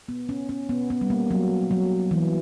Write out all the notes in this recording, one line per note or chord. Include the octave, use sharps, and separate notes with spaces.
B3
C#4
C#4
B3
B3
G3
A#3
F#3
F#3
E3